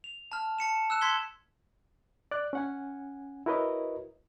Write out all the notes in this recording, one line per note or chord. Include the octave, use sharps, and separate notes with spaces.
F7
A5 F6
A5 C#7 E7
E6 F#6 E7
C6 G#6 B6 G7
D5 F#6
C#4 F#5 G#5
E4 F#4 A#4 B4 C#5 D#5